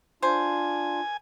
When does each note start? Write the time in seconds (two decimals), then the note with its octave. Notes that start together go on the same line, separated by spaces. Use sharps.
0.23 D4 F4 C5 G#5